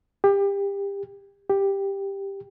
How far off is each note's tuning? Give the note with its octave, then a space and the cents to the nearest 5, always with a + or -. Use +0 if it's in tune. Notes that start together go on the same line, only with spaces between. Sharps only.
G4 +25
G4 +5